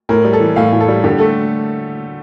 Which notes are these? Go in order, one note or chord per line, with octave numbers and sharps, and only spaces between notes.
A2 A#4
G3
A4
E3
A2 F5
A2
A4
G3
D3 G4
A3 A4